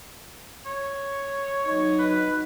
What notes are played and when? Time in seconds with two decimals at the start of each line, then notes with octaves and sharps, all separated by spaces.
0.66 C#5
1.64 F#3 D#4 C#5
1.99 B4